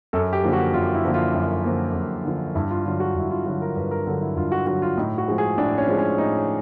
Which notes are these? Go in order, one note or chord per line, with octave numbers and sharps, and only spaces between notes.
F#2 A4
G4
D3 F3 A#3
F#4
F#2 F4
E4
D3 F3 A#3
F4
F#2
D3 F3 A#3
F#2
D3 F3 A#3
G2 E4
F4
D3 F#3 F4
F#4
G2 E4
F4
D3 F#3 F#4
A#4
G2 B4
A#4
D3 F#3 A4
E4
G2 F4
F#4
D3 F#3 F#4
F4
A2 D#4
F#4
F3 G#3
G#4
A2 D4
C#4
F3 G#3
C#4
A2 D#4